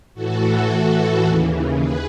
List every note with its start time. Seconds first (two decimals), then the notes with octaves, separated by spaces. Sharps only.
0.14 A2 E3 F#4 A4
0.68 A2 E3
1.23 D#2 C#3 E3
1.78 D#2 G#4 B4